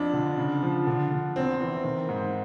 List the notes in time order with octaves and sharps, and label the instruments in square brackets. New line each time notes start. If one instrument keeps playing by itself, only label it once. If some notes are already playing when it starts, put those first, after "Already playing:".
Already playing: [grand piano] F2 D4
D3
C#3
F3
D3
D3
E2 C4
E3
D#3
G#2